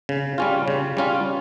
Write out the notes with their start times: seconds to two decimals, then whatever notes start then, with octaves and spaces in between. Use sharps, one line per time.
0.09 C#3
0.38 G3 C#4 F4
0.68 C#3
0.97 G3 C#4 F4